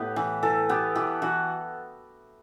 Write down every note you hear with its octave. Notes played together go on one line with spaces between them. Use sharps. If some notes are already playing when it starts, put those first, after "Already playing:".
Already playing: A2 B3 G4
E3
E3 A4
B3 G4
E3 G4
E3 F#4